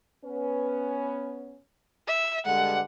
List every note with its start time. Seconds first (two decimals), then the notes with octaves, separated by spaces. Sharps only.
0.24 B3 C#4 B4
2.08 E5
2.45 G2 D3 G#3 F#5